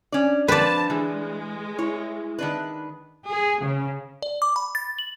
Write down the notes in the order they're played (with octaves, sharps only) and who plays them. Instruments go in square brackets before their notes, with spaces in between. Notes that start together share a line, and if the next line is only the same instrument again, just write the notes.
[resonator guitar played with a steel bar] C#4 D5 [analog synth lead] D4
[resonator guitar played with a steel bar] F3 C4 [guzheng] B4 D5 [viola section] A5
[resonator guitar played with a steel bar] E3 [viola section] G#3
[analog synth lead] E4 [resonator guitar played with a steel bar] C#5
[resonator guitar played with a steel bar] D#3 D4 B4
[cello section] G#4
C#3
[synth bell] D5
D6
B5
A6
F#7